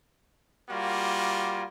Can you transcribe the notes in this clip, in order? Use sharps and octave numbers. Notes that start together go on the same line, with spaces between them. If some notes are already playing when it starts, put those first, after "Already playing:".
G3 A#3 F4 F#4